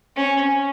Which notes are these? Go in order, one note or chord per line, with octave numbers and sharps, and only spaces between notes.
C#4